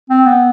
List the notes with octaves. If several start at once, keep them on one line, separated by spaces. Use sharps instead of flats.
C4
B3